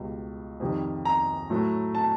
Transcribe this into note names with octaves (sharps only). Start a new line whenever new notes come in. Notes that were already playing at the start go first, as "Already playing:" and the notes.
Already playing: C#2 B2 G3
F2 C3 D#3 G3
A#5
A2 F#3 A3
A5